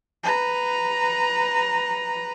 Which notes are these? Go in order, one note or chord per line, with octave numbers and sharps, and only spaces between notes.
B4 A#5